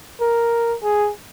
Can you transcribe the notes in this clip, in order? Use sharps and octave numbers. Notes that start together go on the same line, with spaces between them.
A#4
G#4